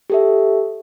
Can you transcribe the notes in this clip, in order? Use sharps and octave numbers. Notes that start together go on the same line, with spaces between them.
G4 A4 E5